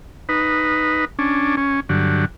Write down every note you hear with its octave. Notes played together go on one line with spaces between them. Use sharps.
D#4 B4
C#4 D4
C#4
G2 D3 F#3